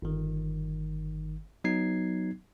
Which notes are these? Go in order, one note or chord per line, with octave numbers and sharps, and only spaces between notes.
G1 D#3
F#3 B3 D#4 G#6 C7